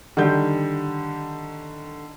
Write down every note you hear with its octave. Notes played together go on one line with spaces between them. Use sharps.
D3 D#3 G3 G6